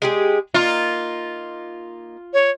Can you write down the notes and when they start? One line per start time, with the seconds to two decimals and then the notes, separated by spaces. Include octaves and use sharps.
0.02 G#3 G4 G#4
0.54 A#3 D#4 F4
2.33 C#5